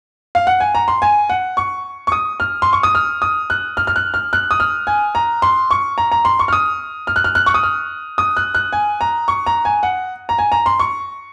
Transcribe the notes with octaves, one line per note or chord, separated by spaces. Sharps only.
F5
F#5
G#5
A#5
C6
G#5
F#5
C#6
C#6
D#6
F6
C6
C#6
D#6
F6
D#6
F#6
F6
F6
F#6
F6
F#6
D#6
F6
G#5
A#5
C6
C#6
A#5
A#5
C6
C#6
F6
D#6
F6
F#6
F6
F#6
C#6
D#6
F6
D#6
F#6
F#6
G#5
A#5
C#6
A#5
G#5
F#5
A#5
G#5
A#5
C6
C#6